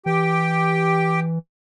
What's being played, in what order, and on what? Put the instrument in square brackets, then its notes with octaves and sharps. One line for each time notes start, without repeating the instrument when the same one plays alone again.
[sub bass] E3 [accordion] G4 G5